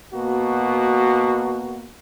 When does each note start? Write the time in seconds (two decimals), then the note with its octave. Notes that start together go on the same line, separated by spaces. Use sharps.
0.14 B2 A#3 F#4